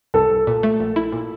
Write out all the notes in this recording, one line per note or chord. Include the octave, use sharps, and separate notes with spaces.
C2 A4
C2
A#2
A3
A#1
E4
A#2